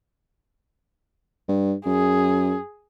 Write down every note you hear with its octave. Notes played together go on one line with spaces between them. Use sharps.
G2
F#2 G#4